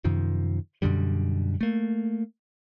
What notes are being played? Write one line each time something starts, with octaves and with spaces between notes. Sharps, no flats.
F#2 C3 D#3 F3
F#2 B2 D3 G3
A3 A#3